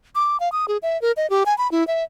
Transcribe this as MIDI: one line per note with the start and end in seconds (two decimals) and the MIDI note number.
0.15 0.37 86
0.40 0.51 77
0.52 0.65 87
0.68 0.77 68
0.83 1.00 76
1.02 1.12 70
1.17 1.29 75
1.30 1.44 67
1.46 1.56 80
1.58 1.70 83
1.72 1.86 64
1.87 2.04 76